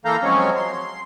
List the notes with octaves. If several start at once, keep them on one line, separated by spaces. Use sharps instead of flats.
E3 A#3 A4 F5 A#5 G6
F3 F#3 G#3 C4 C#4 C#5
C6